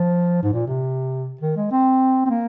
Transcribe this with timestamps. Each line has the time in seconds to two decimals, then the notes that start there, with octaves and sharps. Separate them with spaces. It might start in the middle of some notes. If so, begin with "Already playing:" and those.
Already playing: F3
0.43 G#2
0.53 A#2
0.67 C3
1.41 D#3
1.56 G#3
1.72 C4
2.26 C4
2.30 A#3